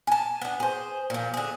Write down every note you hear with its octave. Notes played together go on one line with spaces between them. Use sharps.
G#5 A5
B3 D4
G#4 C5
A#2 F3
D3 G#4